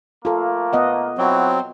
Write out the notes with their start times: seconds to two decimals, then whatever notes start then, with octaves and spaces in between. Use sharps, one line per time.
0.25 A3 A#3 F4 A4
0.73 B3 D#5 F#5
1.18 F#3 C4 E4 F#4